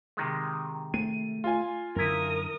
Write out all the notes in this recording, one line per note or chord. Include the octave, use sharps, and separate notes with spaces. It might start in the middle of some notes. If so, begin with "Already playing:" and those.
C3 D#3 G#3
A3 D#7
F4 G#5
F#2 D3 E4 A#4 A#5 D#6